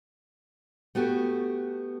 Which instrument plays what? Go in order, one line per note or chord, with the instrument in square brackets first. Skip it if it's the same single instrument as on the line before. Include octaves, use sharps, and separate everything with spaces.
[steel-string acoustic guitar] A3 B3 F#4 G4